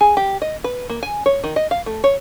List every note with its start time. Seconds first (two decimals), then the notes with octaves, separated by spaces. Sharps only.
0.01 G#4
0.17 G4
0.42 D#5
0.64 B4
0.90 A#3
1.03 G#5
1.26 C#5
1.44 D#3
1.56 D#5
1.71 F5
1.86 A3
2.04 C#5